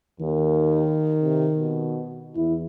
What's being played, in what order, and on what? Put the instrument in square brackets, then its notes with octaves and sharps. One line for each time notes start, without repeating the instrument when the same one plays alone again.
[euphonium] D#2 [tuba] D#3
[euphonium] C3
B2
[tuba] E2 [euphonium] E4